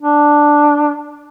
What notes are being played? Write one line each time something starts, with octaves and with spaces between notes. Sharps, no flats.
D4